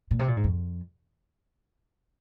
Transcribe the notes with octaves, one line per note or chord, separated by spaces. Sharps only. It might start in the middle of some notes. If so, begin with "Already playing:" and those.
A#2
C3
A#2
G#2
F2